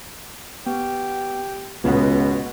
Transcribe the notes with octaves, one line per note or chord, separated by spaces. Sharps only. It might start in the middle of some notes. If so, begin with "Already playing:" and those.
B3 G4
C#2 B2 B3 F4